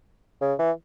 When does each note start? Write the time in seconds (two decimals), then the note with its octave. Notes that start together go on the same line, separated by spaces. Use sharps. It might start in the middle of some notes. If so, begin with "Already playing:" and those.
0.41 C#3
0.59 E3